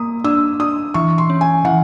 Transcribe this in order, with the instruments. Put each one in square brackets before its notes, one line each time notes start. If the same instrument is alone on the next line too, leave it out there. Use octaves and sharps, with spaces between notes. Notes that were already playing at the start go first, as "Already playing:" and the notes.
Already playing: [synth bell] A#3 [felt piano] D#6
[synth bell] D4 [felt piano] E6
[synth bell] D4 [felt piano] D#6
[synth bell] E3 [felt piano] C#6
[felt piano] C6
[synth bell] C#4
[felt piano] G#5
[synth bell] E3 [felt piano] F#5